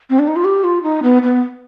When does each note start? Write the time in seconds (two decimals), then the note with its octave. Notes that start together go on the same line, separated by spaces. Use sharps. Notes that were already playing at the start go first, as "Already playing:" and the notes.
0.10 C4
0.19 D4
0.28 D#4
0.36 F4
0.45 G4
0.64 F4
0.83 D#4
1.03 B3
1.23 B3